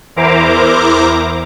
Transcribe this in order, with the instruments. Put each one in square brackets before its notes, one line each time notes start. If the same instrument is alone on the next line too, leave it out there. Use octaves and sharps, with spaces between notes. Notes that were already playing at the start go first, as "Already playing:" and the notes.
[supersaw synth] E2 E4 A#4 C5 A#5 D6